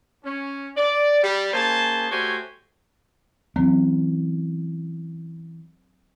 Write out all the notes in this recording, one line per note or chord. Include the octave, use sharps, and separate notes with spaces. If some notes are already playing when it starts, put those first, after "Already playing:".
C#4
D5
G3
A#3 C#4 G#4 C5 G#5 A5
A3 F#4 G4 C5 C#5 G#5
E3 F#3 C4 C#4